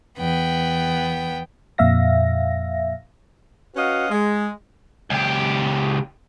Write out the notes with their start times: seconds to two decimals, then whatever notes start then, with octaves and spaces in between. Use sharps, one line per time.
0.18 E2 B3 G5
1.78 F2 A#2 E5 F5 A#6
3.76 C#4 F#4 B4 D#5 F5 F#5
4.10 G#3
5.10 C#2 G4